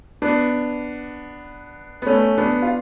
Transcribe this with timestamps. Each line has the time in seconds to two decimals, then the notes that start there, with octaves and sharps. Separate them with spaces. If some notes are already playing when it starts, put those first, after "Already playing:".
0.22 B3 D4
2.02 B3
2.07 A3 C#4
2.38 B3 D4
2.62 F4